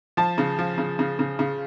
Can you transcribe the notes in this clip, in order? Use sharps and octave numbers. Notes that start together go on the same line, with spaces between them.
F3 A5
C#3
F3
C#3
C#3
C#3
C#3